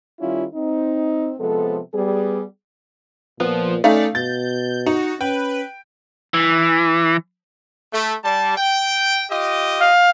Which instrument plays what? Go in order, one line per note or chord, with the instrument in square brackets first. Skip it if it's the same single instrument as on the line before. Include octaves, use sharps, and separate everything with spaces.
[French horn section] D#3 G3 C#4 E4 F4
C4 D#4
C3 F3 G#3 B3 A4
G3 B3 G#4
[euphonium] A#2 [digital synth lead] F3 [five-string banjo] B3
[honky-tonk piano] A3 C#4 D#4 [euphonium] A4 [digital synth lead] D5 [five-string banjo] F5
[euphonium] B2 [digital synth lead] G6 [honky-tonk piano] A6
[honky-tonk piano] D#4 [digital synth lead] F#4
[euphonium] C#4 [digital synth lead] B4 [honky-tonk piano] G5
[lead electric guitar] E3
[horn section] A3
G3 A5
G5
F4 G4 D#5
[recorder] F5